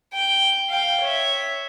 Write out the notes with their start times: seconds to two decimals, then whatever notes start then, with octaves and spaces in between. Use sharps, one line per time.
0.13 G5
0.69 F5 G5
1.01 C#5 E5